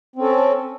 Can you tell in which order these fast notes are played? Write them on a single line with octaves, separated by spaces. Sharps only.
C4 C#4 A4